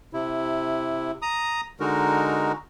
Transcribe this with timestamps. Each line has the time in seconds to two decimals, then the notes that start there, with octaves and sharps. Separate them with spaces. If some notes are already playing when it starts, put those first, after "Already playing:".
0.13 C3 E4
1.22 A#5 D#6
1.80 D3 G#3 D#4 F#4 A#4